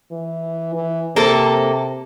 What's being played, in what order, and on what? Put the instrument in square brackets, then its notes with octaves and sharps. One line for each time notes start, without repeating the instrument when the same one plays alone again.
[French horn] E3
E3
[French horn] C3 [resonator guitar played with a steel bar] A#3 A4